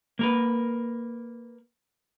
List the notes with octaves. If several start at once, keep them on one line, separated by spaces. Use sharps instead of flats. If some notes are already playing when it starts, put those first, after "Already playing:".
A#3 A#4 B4